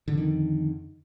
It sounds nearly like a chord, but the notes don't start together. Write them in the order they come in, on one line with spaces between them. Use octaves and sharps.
D3 F2 D#3